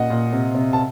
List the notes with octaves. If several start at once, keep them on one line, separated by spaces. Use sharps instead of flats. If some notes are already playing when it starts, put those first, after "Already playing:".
Already playing: A#2 C#4 D#5 F#5
A#2
C3
C3
A5